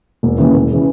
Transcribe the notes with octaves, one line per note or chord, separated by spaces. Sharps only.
E1
D#2 C#3 E3
E1
C#3 E3